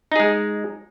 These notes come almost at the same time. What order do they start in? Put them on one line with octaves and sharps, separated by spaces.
D#4 G#4 G#3